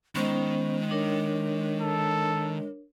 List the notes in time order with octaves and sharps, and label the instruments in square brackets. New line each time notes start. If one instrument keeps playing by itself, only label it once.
[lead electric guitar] D#3 [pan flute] G#3 [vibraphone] B3 C#4 C5
[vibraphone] D4 A#4 C#5
[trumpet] A4